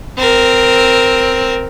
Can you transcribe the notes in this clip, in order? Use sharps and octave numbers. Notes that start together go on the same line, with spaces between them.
C4 A#4